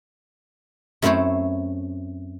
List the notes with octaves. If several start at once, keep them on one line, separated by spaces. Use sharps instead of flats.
F#2 A3 C4 E4 C5 C#5